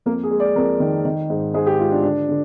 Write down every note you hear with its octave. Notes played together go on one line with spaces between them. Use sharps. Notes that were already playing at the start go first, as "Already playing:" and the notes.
F2 A#3
G#4
G#3
D5
F2 A#4
D#3
D#3
G#2
G#2 G#4
G4
G#3 F4
D4
D3 D4
D3